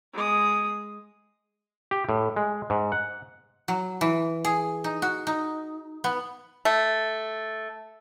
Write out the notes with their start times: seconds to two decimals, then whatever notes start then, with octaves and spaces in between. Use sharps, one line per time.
0.14 G#3 D#6
1.91 G4
2.09 A2
2.36 G#3
2.70 G#2
2.92 F#5
3.68 F#3
4.01 E3
4.45 G#4
4.84 D#4
5.02 F#4
5.27 D#4
6.04 B3
6.65 A3